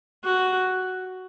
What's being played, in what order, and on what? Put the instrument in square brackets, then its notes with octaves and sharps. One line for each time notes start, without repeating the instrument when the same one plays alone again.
[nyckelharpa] F#4